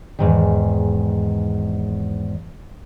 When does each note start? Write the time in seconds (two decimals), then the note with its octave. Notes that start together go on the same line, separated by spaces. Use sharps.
0.19 E2 G#2 D#3